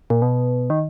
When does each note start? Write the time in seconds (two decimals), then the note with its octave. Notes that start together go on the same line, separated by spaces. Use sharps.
0.10 A#2
0.22 B2
0.70 D#3